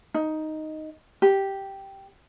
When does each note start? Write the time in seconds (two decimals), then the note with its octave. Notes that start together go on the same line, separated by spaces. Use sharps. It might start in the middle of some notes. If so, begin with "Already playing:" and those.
0.14 D#4
1.22 G4